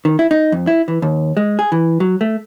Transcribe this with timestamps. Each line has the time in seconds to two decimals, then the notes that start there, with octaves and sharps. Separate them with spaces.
0.05 D#3
0.19 E4
0.31 D#4
0.52 F2
0.67 E4
0.88 E3
1.02 D#2
1.37 G#3
1.59 G#4
1.72 E3
2.00 F#3
2.21 A3